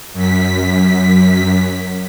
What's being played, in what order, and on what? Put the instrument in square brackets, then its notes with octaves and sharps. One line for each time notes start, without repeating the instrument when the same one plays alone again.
[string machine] F#2 B6